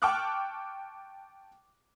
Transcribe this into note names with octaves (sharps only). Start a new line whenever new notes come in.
G5 A5 C#6 D6 F6 F#6